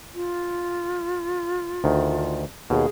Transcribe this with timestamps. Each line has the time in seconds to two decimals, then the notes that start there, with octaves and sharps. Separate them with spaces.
0.14 F4
1.84 D2 D#3
2.70 D#2 B2 G#4